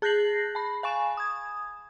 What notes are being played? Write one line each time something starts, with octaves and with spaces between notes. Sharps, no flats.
G#4 F#6 G6 A#6 C7 F#7
A5 B5
F5 G#5 C#6 E7
D#6 G#6